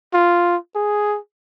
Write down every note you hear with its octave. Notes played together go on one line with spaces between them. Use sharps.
F4
G#4